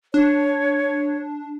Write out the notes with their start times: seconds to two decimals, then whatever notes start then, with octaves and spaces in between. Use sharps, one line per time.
0.14 D4 C#5